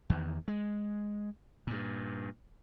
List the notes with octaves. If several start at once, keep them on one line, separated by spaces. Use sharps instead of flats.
E2 D#3
G#3
G2 A#2